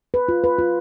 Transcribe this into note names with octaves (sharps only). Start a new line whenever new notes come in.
B4
F4
B4
F4